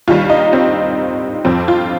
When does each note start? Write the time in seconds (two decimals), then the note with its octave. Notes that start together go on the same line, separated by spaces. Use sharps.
0.07 D#2 D#3 G3 F4
0.30 D#4
0.53 C4
1.45 F2 F3 C4
1.68 F4